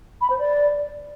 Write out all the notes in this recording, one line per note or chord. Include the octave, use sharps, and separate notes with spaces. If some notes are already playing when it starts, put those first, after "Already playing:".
B5
C5
D5